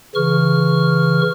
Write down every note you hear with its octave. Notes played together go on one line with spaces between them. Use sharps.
C#3 E3 C#6 F6